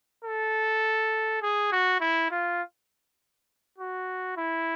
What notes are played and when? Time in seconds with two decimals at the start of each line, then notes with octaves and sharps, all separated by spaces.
0.24 A4
1.42 G#4
1.72 F#4
2.00 E4
2.31 F4
3.78 F#4
4.37 E4